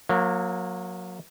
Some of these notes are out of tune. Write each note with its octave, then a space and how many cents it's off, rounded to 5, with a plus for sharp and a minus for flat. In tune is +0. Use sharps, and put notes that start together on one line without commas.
F#3 -30 A#3 +0